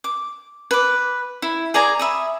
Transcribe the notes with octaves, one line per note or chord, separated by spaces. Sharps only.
D6
B4 D6
E4
G#4 D5 G#5 A#5
E5 B5 D#6